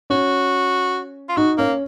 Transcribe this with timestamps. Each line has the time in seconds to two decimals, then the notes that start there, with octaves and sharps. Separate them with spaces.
0.10 C#4 F#4
1.29 F4
1.37 D#4 F#4
1.58 A#3 C#4